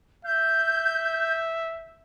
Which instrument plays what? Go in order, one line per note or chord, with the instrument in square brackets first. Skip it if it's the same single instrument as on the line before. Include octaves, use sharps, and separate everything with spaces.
[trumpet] E5 [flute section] G6